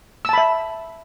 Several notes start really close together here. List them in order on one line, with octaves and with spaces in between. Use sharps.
E6 A5 B5 E5